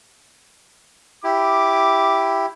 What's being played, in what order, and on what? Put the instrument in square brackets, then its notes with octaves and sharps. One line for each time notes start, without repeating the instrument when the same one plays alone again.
[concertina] E4 G4 [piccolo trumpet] D6